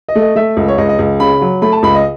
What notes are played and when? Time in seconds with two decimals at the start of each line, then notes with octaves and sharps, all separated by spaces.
0.09 D#5
0.15 A3
0.22 D#5
0.35 A3 E5
0.57 C#2
0.68 C#5
0.78 C#2 D#5
0.89 D#5
0.99 C#2
1.20 C#3 B5
1.41 F#3
1.62 A3 B5
1.72 A5
1.83 C#2 B5
1.94 D#5